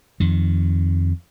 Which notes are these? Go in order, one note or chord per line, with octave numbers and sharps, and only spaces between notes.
F2 D#3